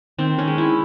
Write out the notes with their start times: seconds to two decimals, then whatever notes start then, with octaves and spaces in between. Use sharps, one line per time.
0.18 D#3 C4
0.38 C#4
0.47 G#3
0.58 E4